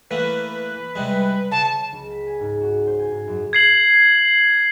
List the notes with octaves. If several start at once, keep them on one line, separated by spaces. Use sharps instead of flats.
E3 A3 A#3 B4
C3 G3 G#3
C#3 A5
C#2
B6
G#5
G#2
F#4
C5
G#5
G#2
F#2
G#6 C7 F#7